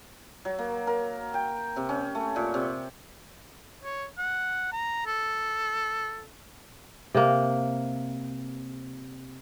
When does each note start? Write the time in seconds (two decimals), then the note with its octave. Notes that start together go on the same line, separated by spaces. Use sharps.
0.45 F#3
0.59 A#3
0.87 A#4
1.34 G5
1.76 C3
1.89 C#4
2.15 A3
2.36 A#2
2.54 C3
3.84 C#5
4.18 F#5
4.73 A#5
5.06 A4
7.15 C3 A#3